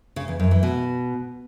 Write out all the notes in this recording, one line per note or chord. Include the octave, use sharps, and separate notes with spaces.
C#3
E2
F#2
E3
B2